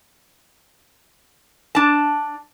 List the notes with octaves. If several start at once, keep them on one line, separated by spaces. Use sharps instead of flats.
D4 A5